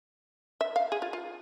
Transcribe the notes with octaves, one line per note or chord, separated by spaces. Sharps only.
E5
F5
G#4
F4
F4